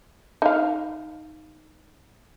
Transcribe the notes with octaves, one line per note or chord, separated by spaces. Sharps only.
D#4 F5